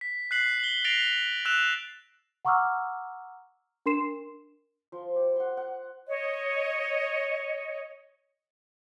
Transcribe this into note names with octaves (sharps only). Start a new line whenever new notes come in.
B6
F#6 B6 C7 F#7
F#7 G7
A6 A#6 C7 D7 F7
E6 F#6 E7 F7
F#5 A#5 C#6 D6 E6 F6
D4 A#4 C6 C7 E7
F3 C6
G4
F#5 C6
F#5
C#5 D#5